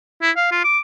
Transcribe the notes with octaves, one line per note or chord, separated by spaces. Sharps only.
E4
F5
F4
D6